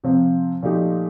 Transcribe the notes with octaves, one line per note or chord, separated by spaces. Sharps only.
C3 F3 C4
A#2 F3 A3 D#4 G4